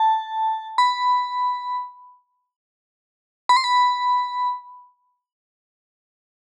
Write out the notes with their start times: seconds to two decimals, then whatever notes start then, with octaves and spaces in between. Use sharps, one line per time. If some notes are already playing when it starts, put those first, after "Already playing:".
Already playing: A5
0.78 B5
3.49 B5
3.57 C6
3.64 B5